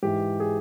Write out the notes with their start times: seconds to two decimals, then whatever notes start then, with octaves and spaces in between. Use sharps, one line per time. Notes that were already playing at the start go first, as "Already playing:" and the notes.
0.03 G#2 E3 G4
0.40 G#4